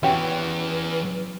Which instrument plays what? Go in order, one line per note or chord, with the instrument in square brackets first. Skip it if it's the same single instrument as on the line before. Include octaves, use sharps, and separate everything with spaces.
[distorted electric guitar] E2 E3 [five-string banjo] C#4 F#4 G4 [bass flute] B4